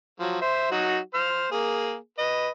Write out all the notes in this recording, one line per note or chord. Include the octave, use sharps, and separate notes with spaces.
F3 F#3
C5 E5
F#3 D#4 F#4
C5 F6
A#3 G#4
B4 D#5